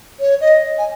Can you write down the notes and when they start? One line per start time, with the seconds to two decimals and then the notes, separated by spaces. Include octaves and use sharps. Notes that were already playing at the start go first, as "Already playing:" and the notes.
0.19 C#5
0.41 D#5
0.78 G#5